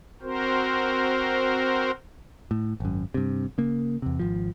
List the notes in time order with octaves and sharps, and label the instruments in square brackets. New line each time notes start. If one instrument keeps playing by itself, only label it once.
[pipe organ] C4 F#4 A#4 C5
[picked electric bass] A2
G#1 F#2
G2 C3
C#3 A#3
E2 C3
G#1 F3